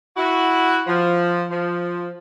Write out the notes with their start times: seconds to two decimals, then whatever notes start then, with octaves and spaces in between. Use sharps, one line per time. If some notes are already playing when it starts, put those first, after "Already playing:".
0.17 E4 F#4
0.87 F3
1.50 F3